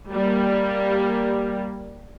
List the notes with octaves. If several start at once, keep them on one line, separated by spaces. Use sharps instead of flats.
G3 A#3